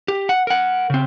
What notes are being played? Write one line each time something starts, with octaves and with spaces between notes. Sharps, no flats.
G4
F#5
A#4 F#5
C#3 C4